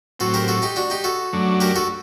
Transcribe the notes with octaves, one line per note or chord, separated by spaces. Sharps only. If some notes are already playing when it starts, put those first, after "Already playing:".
A2 F#3 C4 F#4 A4
G4 A#4
F#4 A4
D#4 G4
D4 F#4
D#4 G4
F#4 A4
F#2 F#3 A3 D4
G4 A#4
F#4 A4